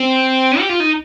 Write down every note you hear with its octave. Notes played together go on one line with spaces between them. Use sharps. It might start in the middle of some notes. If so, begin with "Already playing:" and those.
Already playing: C4
G4
F4
D#4